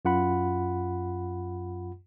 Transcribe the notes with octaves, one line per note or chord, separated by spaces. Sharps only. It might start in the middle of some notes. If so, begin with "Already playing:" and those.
F#2 F4 F#5 B5